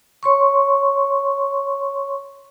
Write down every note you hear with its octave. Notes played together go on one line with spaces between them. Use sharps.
C#5 C6 C#6